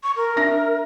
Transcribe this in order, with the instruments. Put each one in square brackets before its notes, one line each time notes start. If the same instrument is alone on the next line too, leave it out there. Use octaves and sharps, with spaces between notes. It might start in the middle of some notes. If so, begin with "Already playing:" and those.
[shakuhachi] C#6
A#4
[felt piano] D4 E5 A#6